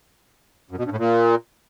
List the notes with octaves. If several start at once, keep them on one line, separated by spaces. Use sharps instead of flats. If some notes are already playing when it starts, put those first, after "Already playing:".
F#2
B2
G2
A2
A#2